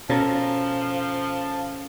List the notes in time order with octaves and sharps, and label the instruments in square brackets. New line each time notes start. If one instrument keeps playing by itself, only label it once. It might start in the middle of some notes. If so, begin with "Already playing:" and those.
[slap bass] B2 [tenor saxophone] F3 [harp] C#4 A4 A#4 [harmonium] A5